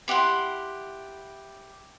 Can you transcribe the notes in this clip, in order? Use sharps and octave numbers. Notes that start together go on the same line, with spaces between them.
E4 G4 F#5 C6